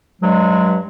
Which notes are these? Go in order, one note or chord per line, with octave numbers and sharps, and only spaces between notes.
G2 F#3 G#3